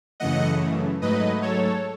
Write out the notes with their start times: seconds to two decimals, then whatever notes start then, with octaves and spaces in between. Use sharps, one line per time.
0.20 F#2 C#3 E3 A3 D#5 F#5
1.02 G#2 F#3 A3 B4 D#5
1.42 A4 C#5